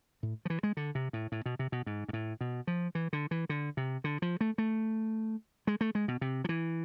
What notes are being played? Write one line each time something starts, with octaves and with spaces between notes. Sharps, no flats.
A2
F3
E3
G#3
D3
C3
A2
A2
B2
C3
B2
G#2
G#2
A2
B2
F3
E3
D3
E3
D3
C3
D3
F3
A3
A3
G#3
A3
G#3
B2
C3
F3
E3